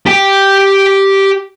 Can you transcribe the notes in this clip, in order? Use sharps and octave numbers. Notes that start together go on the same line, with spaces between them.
G4 G5